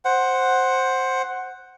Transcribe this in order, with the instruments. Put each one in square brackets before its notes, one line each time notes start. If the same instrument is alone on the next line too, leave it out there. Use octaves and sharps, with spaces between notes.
[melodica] C5 F#5